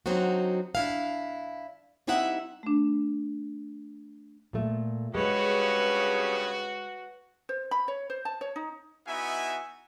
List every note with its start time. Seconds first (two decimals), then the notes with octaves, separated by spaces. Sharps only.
0.06 D3 F#3 C4 D#4 F#4
0.75 D4 E4 F5
2.07 G3 C4 D#4 E4 E5 F#5
2.63 A3 D4
4.53 A#2 A3
5.15 G2 C#3 G#3 F#4 B4 C#5
7.49 C5
7.71 B5
7.88 C#5
8.10 C5
8.25 A5
8.41 C#5
8.56 D#4
9.06 B3 D#4 E4 F#4 E5 G#5